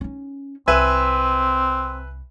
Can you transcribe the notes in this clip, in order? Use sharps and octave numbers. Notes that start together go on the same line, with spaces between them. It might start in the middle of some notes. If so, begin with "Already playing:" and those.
C#4 D#4
C2 C4 B4 E5 G#5